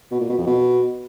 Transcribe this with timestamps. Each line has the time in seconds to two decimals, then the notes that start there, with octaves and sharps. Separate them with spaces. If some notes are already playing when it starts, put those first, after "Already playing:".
0.12 B2
0.20 A#2
0.29 B2
0.38 F2
0.47 B2